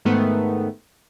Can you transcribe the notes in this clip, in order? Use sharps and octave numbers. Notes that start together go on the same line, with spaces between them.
G#2 D#3 A3 B3